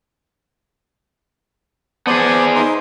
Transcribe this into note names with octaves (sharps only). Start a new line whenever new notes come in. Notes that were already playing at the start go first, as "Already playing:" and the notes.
B3 G#4 C5 D5 A5
D#4 C5 C6